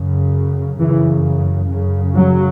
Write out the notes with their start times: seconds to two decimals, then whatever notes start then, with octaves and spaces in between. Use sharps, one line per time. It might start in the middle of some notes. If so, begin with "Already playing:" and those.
Already playing: F#2 C#3
0.79 F#2 C#3 E3
1.70 F#2 C#3
2.15 F#3